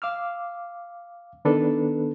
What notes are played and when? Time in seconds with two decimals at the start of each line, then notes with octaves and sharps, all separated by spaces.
0.02 F5 D6 E6 F6
1.45 D#3 B3 D4 A4 B4